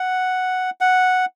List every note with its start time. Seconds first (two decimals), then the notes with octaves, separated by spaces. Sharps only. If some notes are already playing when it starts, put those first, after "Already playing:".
Already playing: F#5
0.81 F#5